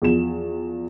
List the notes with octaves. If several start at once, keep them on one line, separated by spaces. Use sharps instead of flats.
E2 F3 E7